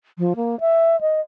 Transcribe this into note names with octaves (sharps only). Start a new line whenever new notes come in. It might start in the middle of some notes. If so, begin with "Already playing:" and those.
F3
A#3
E5
D#5